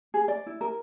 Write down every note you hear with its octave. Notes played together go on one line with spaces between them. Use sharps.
G#4
D5
E4
A#4